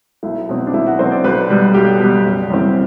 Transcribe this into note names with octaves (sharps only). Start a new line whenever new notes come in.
B1 E4
B2 F#3 C4
D4
B1 E4
F#4
B2 F#3 C4 C5
D5
B1 B4
B2 G3
B1 G4
B2 G3
F#1
F#2 E3 G3 C4